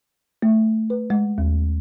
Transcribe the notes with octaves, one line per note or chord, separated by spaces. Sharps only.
A3
B4
G#3
D#2